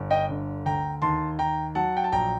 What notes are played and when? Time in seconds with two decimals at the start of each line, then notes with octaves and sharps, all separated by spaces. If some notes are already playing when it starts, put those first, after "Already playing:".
Already playing: G1
0.11 D#5 G5
0.29 D3
0.66 D2 G5 A#5
1.02 D#2 A5 C6
1.39 D#2 G5 A#5
1.75 F#3 F#5 A5
1.97 G5
2.04 A5
2.12 A#1 G5 A#5